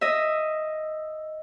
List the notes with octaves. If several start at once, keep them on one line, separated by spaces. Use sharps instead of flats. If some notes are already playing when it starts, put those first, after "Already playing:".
D#5 E5